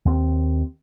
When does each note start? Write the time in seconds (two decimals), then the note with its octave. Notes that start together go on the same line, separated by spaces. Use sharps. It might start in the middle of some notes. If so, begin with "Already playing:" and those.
0.05 D#2 C4